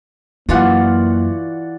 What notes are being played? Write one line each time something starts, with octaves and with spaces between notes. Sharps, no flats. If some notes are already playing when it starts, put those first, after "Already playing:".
F#2 E3 A#3 F4 F#4 D5 F#5